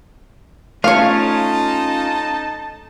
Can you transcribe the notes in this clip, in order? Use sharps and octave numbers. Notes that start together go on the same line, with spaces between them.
A3 C#4 D#4 F4 C#5 F5 A5